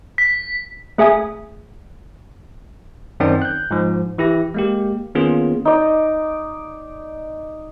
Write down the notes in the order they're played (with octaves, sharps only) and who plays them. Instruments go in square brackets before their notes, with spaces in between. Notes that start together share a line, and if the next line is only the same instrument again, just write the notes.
[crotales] B6
[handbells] A3 G#4 E5 G#5 D#6
[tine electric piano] F#2 D#3 C4 D#4 D5 G5
F#6 G6
G#2 F3
E3 E4 G4 A#6
G#3 A#3 G4
D#3 A#3 B3 C#4 F4 G#4
[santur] D#4 D5